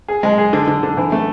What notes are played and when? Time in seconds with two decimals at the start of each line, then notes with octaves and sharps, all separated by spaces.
0.08 G#4
0.23 G#3
0.38 G#4
0.53 D3
0.67 D3
0.83 D3
0.97 E3
1.12 A3